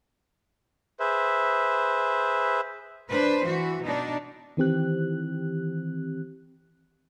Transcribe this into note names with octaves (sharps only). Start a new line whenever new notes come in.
G#4 B4 C5 E5
D4 B4 C5
E3 F#4
B2 D4 D#4
D#3 E3 C4 G4 F#6